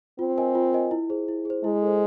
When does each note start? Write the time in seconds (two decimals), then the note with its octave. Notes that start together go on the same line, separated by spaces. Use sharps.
0.19 C4 F4
0.38 A#4 D#5 G#5
0.55 F4
0.73 A#4 D#5 G#5
0.91 E4
1.10 G#4 C5
1.28 E4
1.45 G#4 C5
1.64 G#3 E4
1.82 A4 C5